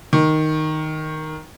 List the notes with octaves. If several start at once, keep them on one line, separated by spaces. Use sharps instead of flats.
D#3